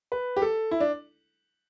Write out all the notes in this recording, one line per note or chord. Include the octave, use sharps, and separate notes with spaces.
B4
G4
A4
E4
D4